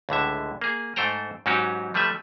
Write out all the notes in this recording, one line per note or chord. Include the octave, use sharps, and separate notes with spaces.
C#2 A2 D3 E5
A#3 G#4
G#2 A3 A4 C5 G5 A#5
G#2 F#3 C#4 D#4 F#4 G4
F3 G3 A3 B4 E5